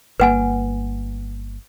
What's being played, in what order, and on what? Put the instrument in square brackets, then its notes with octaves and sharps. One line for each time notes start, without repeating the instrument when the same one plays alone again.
[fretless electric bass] G1 A#3 [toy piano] B4 F#5 G#5